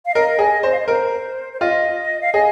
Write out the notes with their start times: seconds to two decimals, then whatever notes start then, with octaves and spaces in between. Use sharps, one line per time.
0.06 F5
0.14 A#4 D#5
0.39 G#4
0.63 C5
0.72 F5
0.80 D#5
0.88 A#4 C5
1.53 C5
1.61 F4 D#5
2.21 F5
2.34 G#4 D#5